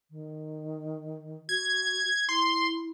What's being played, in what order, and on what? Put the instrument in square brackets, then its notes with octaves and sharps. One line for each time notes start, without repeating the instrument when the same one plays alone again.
[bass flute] D#3
[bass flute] F#4 [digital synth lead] G#6
[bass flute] E4 [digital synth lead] C6